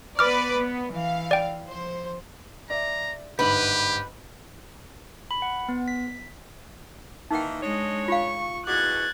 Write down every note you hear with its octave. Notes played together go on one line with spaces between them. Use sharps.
B3 B4 D5 D6 F6
B3
E3 F5
D5 G5
F3 C5
D5 E5 A#5
G1 G#2 G4 B4 F#7
B5
F#5
B3
B6
D#3 E3 A#3 D#4 G5
G#3 D4 C#5 D#5
F4 F5 C#6
E2 B2 F#4 D6 F#6 G#6 A6